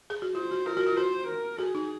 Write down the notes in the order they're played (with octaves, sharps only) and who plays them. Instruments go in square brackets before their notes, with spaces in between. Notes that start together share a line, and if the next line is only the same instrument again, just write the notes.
[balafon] G#4
F#4
[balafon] F4 [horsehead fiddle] C5
[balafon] F#4
[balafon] F4 [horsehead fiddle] A#4
[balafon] F#4
F4
[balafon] F#4 [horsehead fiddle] C5
[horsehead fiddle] A#4
[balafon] F#4 [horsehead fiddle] G#4
[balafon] D#4